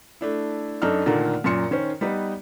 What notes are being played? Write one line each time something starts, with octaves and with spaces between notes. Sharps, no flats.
A3 D4 E4
F#2 D4 D#4 A4 F6
A#2 D3 D#3 A3 A#3
F#2 A#2 C6 C#7
D#3 C#4 C5
G3 B3 D#4 B4